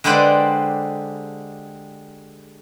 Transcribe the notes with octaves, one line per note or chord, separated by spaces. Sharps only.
D3 G#3 G4 B4 C5 D5